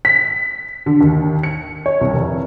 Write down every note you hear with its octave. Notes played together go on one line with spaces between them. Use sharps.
B6
D3
D#2
C#7
C#5
C2
F1